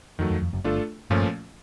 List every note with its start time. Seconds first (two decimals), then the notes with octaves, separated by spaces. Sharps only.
0.19 F2 D#3 F#3 A3
0.30 F2
0.42 F2
0.53 F#1 F#2
0.64 G1 G2 A3 D4 F4 A4
1.10 G1 G2 A#2 F3 A3 C#4 F4